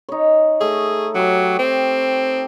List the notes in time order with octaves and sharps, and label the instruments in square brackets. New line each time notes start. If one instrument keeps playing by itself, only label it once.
[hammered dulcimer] D#4 C#5
[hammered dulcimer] A3 [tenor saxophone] G#4
[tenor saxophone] F#3 [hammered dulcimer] G4 C#6
[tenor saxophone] C4